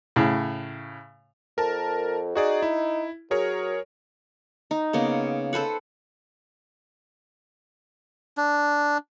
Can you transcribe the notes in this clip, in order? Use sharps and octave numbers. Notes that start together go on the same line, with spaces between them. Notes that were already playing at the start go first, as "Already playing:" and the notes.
A2 C#3
F2 A#4 A5
D#4 F#4 G#4 D5
E4
F#3 G#4 A#4 C#5
D#4
C#3 A#3 B3
A4 B4 C5 F#5
D4